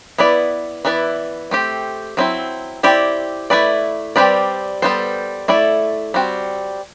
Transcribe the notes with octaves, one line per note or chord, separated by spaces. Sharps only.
B3 E4 B4 D5
E3 B3 E4 B4 D5
A3 C4 G4
F#3 C4 E4
C4 E4 G4 D5
A3 E4 B4 D5
G3 C4 G4 B4 D5
G3 B3 F#4 A4 C5
A3 E4 A4 D5
G3 C4 F#4